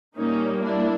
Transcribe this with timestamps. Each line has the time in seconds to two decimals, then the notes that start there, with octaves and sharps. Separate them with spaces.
0.17 A#2 G3 A#3 C#4 D#4
0.64 D4 E4